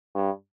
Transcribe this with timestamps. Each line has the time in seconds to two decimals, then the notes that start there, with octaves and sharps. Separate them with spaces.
0.15 G2